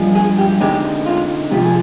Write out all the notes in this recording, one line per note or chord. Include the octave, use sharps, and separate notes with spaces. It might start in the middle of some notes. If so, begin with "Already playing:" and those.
Already playing: G2 F3 G#3
G#4
G4
D3 G#3 C4 D#4 G4
F4
F2 C3 F3 G4
G#4